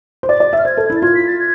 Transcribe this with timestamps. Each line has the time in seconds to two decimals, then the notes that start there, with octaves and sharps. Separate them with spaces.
0.23 C5
0.29 D5 A6
0.40 D5
0.53 E5
0.58 F6
0.65 C5 G#6
0.77 A4
0.90 E4
0.96 A6
1.02 F4 G#6
1.15 B6
1.27 A6
1.39 G#6